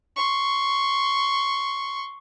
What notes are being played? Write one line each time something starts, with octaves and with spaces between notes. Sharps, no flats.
C6 C#6